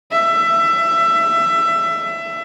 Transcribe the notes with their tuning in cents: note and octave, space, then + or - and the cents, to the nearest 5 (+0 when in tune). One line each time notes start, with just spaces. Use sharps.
E5 +20